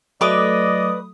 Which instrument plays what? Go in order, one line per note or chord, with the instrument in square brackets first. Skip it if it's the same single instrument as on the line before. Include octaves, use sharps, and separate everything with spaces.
[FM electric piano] F#3 A3 D#6 [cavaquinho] B4 D6 [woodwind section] D5 D#5